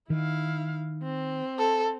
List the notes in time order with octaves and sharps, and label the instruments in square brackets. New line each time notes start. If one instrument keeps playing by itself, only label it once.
[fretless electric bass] D#3 [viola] E4 F5
[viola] C4
[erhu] A4